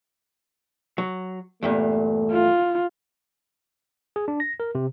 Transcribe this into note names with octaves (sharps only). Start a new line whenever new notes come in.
F#3
E2 G2 A#2 A3
F4
G#4
D4
A#6
A#4
C3